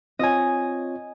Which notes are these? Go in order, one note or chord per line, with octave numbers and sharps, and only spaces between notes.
C4 F4 C#5 D#5 G#5